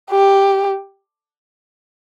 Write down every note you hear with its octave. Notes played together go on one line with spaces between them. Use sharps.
G4